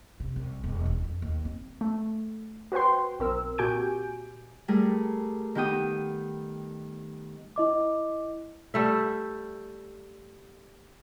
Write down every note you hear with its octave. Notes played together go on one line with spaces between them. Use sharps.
C3
C2
E1
E2
F2
D#2
C4
A3
F#4 B4 C5 G5 C6
B1 C4 A#4 E6
A#2 F#4 G4 G#5 G6 D7
G3 A3 G#4 A#4
D#3 B3 G4 G5 D#6
E4 D#5 D6
G3 A3 E5